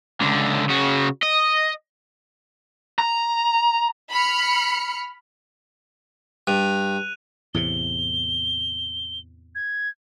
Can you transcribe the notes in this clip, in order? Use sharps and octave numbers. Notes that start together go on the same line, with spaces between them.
C#2 D3
C#3 F#4
D#5
A#5
B5 F6 C#7
G2 F#6 D#7 F7
E2 A2 C3 G7
G#6